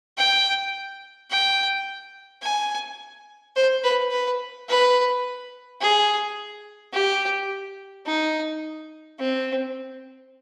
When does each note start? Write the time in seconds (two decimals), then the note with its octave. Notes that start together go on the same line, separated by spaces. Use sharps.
0.18 G5
1.30 G5
2.42 G#5
3.56 C5
3.84 B4
4.11 B4
4.68 B4
5.81 G#4
6.93 G4
8.06 D#4
9.19 C4